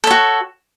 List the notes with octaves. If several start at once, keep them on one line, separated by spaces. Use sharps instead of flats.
F#4 A4 C#5